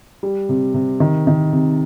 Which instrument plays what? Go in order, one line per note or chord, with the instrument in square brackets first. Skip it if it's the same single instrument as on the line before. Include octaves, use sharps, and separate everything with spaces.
[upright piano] G3
C3
C3
D#3
D#3
C3